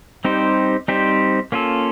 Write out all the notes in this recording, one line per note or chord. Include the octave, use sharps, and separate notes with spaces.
G3 C4 D#4 G4 C5
G3 C4 D#4 G4 C5
A#3 C#4 F4 A4